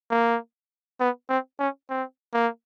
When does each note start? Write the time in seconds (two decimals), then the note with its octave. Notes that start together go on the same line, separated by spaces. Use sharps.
0.11 A#3
1.00 B3
1.29 C4
1.59 C#4
1.90 C4
2.34 A#3